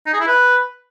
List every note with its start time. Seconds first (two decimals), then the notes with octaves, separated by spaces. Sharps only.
0.06 D#4
0.13 G#4
0.20 E4
0.27 B4